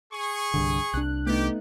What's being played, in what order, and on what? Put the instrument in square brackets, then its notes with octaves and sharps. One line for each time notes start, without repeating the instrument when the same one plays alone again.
[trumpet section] G#4 C#6
[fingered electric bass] C2 G2 D3
[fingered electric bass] C2 D4 [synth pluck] F#6
[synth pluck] A3 B3 D#4 [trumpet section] G4